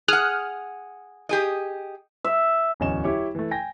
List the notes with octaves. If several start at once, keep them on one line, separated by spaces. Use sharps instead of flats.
G#4 F#5 D#6 F6 F#6
G4 G#4 D#5
E5
D1 E2 C#4 D#5 G#5 E7
E4 G4 C#5
E3 A3
G5 G#5 A#6